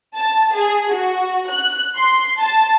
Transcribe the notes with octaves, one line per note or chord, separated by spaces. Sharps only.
A5
G#4
F#4
F#6
C6
A5